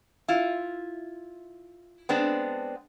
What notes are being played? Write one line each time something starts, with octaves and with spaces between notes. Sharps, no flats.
E4 F4
G#3 B3 C4 D4